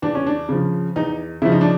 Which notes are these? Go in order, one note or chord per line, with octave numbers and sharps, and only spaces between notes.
E2 D4
C#4
D4
C#3 F3
E2 D#4
C#3 F3 E4
D#4
D4